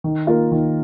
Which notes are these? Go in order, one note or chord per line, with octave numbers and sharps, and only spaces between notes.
D#3
A#3 F4 A#4
D#3